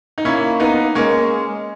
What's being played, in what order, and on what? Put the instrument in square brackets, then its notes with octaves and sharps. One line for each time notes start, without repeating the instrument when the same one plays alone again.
[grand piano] D#4
[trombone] A#3 [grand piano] C#4 E4
[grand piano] B3 D#4
[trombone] G#3 [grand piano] A#3 C#4